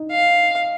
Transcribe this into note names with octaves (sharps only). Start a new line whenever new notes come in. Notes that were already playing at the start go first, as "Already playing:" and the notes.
Already playing: D#4
F5